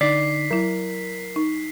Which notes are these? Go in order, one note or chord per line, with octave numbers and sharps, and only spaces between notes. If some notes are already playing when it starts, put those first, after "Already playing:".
D3 D#4 D5 B6 C7
F#3 E4 A#4
D#4